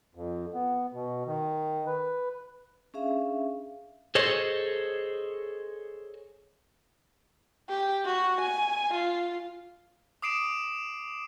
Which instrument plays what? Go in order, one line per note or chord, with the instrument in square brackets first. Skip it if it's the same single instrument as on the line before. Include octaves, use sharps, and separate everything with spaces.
[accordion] F2
B3
B2
D#3
B4
[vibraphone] C#4 D4 G#4 E5 F5
[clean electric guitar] G#4 A4 C5 C#5 D#5
[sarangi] G4
F#4
G#5
F4
[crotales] D6 D#6 C7 D7 E7